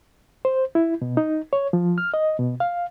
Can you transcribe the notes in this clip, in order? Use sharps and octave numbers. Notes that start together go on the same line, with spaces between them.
C5
E4
B2
D#4
C#5
F3
F6
D#5
B2
F5